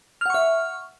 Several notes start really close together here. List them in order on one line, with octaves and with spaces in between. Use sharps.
F6 F#5 C#6 E5